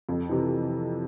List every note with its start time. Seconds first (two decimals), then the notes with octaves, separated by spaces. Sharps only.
0.09 F2
0.29 C3 E3